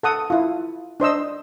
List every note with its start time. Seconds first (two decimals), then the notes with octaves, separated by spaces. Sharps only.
0.03 A4 F#5 D#6
0.30 E4 F4
1.00 D4 C5 D#5 E6